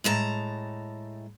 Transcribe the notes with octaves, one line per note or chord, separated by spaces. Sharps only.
A2 G#3 A5 A#5